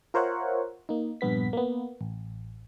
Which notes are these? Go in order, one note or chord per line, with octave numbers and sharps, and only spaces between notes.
F4 A#4 C5 C#5 E5 F#5
A#3 D#4
A#1 G2 B3 B6
A#3 B3
A1